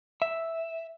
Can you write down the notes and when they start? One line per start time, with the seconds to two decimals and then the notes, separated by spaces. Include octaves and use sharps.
0.22 E5